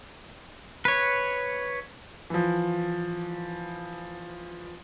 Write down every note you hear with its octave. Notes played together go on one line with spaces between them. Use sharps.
B4 C#5
E3 F3